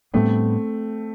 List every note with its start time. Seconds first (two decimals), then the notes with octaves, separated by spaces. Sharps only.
0.14 A2 G3 A3 B3 C4 D4